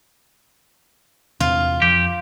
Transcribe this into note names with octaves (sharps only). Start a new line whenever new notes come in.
E2 C3 F4
F2 G4